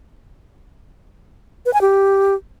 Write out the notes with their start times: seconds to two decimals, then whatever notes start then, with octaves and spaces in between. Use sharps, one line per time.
1.66 B4
1.74 G#5
1.81 G4